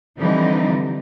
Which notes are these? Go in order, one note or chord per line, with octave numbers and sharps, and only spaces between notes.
D3 E3 F3 G3 C4 D#4